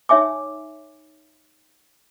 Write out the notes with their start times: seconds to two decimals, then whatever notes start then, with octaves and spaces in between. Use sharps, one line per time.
0.09 D#4 C#5 E5 G#5 D6